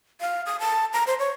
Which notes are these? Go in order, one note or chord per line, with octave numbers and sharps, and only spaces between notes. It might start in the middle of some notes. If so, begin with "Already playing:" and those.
F5
D#6
A5
A#5
C5
C#5